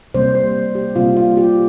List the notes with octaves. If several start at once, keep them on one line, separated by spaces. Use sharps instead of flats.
C3 G3 A#3 C5
C5
G4
C3 G3 A#3 F4
F4
G4